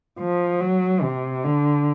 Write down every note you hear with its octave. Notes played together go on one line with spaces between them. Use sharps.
F3
F#3
C3
D3